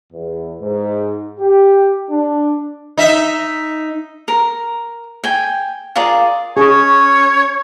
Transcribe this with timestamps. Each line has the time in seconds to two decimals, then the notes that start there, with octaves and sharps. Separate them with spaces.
0.13 E2
0.61 G#2
1.39 G4
2.10 D4
2.98 D#4 E5
4.28 A#4
5.24 G5 G#5
5.96 F4 G#4 A#4 D5
6.57 C#4 G#4 C#5